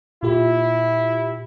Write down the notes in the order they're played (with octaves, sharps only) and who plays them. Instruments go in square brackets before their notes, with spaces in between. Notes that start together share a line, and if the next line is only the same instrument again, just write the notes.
[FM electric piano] A#2 F4 G4 [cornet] E4